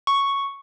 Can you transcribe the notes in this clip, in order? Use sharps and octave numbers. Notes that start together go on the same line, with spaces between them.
C#6